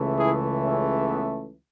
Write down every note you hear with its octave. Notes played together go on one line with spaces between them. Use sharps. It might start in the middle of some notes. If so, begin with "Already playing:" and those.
Already playing: C#2 C#3 E3 A3
E4 G#4
C#4 E4
B3